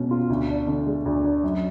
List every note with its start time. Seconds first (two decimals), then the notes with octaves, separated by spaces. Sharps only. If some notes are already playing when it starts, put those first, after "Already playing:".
Already playing: B2 G#3 C#4
0.11 F4
0.30 D2
0.48 D4
0.67 D3
0.87 G#3
1.06 D2
1.24 D4
1.43 F#2